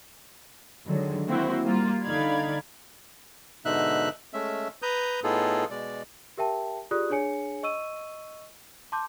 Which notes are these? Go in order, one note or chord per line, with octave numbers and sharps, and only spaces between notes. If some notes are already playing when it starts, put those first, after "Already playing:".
D3 D#3 F#3 G#3
A#3 C4 E4 F#4 C5
G3 A#3 F4
D3 D#4 D5 F5 B5 G#6
G#2 B2 D3 D#4 E5 F#6
G#3 A3 C#4 E5
B4 A#5 D#6 G6
A2 B3 D#4 F4 G#4 A4
B2 G#3 D5
G4 A#4 E5 G5 A5
F4 G4 G#4 D5 D#6 F#6
D4 G#4 C#5 G#5 C#7
D#5 C#6 E6 D#7
A5 C6 D6 G6